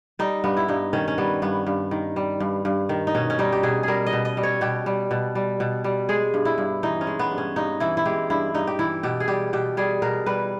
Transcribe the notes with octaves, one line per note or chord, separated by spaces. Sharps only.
G3 D#4
G2 B3
E4
G2 D#4
D#3 C#4
C#4
G3 B3
G2 B3
G2
D#3
G3
G2
G2
D#3
D#4
B2 C#4
C#4
G3 D#4
G4
B2 G#4
G3 G#4 A#4
D#5
B2
D#5
G3
C#5
B2 G4
G3
B2
G3
B2
G3
G#3 G#4
G2
E4
G2
E3 D#4
C#4
G#3
B3
G2
C#4
G2 D#4
E3 E4
E4
G#3 G4
G2 E4
G2 D#4
G4
E3 E4
B2 G4
G#4
G3 G4
B2 G4
G3 G#4
B2 A#4
G3 B4